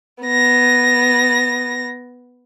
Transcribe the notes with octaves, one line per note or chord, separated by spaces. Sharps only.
B3 A#6